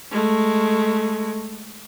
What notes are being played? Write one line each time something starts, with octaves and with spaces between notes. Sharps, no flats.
G#3 A3